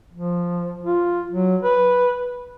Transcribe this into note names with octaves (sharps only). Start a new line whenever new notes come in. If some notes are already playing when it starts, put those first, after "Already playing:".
F3
F4
F#3
B4